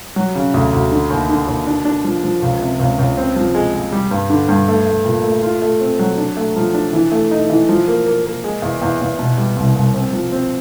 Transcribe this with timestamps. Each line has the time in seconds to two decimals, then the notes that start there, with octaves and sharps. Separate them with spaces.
0.16 F#3
0.35 C#3
0.54 D2
0.73 D2
0.92 D3
1.10 D#2
1.29 D3
1.48 D#2
1.67 D4
1.85 D4
2.04 F3
2.24 F3
2.42 C#2
2.61 C3
2.79 C#2
2.98 C#2
3.17 C4
3.36 F3
3.55 G#3
3.74 G#3
3.92 G3
4.11 G2
4.30 D3
4.49 G2
4.68 A3
4.87 A3
5.05 A#2
5.24 A3
5.43 F4
5.62 A3
5.81 C4
5.99 F#3
6.18 D4
6.37 A3
6.56 F3
6.75 D4
6.93 E3
7.12 A3
7.31 D#4
7.50 E3
7.69 F3
7.88 A#3
8.06 A#3
8.25 A#3
8.44 G#3
8.62 E2
8.82 E2
9.01 E2
9.19 B2
9.37 G3
9.56 C2
9.76 C2
9.94 C4
10.13 F3
10.32 C4